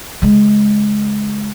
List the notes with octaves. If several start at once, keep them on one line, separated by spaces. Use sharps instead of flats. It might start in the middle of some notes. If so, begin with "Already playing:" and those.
C#3 G#3